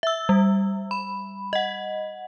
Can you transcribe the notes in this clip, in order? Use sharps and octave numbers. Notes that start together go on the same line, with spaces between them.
E5 E6
G3
B5
D#5 F#5